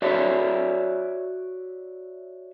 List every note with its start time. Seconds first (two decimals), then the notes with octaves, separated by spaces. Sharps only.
0.02 F#4 C#5 D5 E5